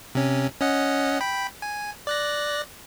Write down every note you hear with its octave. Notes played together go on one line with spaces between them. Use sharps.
C3 C#4
C#4 D#5 F#5
G5 B5
G#5
D5 F#6 A#6